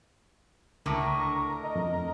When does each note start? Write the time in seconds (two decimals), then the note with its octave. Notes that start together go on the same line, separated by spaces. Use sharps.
0.86 C#2 A2 D3 A#4 C#6
1.63 D#5
1.76 F2